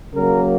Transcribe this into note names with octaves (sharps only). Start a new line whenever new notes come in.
C#3 F#3 A#3 A#4